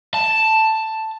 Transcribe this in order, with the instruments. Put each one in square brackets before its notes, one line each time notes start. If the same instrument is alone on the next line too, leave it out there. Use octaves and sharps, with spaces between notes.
[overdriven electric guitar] A5